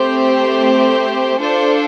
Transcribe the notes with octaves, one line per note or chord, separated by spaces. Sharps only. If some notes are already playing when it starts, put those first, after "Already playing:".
Already playing: A3 C4 G4 C5
D4 F4 A4 C5